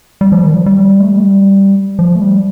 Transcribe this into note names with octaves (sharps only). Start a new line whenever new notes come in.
G3
F3
D#3
F3
G3
A3
G3
F3
A3
G3